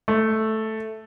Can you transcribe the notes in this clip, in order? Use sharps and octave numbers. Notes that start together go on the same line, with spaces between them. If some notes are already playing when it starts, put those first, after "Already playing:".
A3